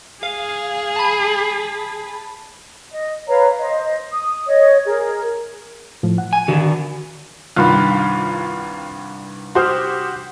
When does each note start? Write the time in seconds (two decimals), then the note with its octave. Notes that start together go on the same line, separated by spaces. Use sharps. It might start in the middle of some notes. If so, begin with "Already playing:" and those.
0.23 G#4 F5
0.96 A5 B5
2.92 D#5
3.28 B4 C#5 F5 A#5
3.59 C5 D#5
4.12 D#6
4.48 C#5 D#5
4.85 G#4 A#4
6.03 A2 F3
6.18 F#5
6.33 G#5
6.48 D3 D#3 F#4
7.56 C2 G2 D#3 F4 B5 C6 F#6
9.55 F#4 G4 C5 C6 D#6 F6